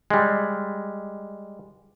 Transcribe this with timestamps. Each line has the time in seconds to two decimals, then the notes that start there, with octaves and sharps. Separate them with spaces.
0.10 G3 G#3